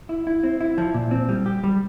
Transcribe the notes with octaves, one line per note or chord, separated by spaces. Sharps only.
E4
E4
C4
E4
F3
A#2
C4
G3
G4
G3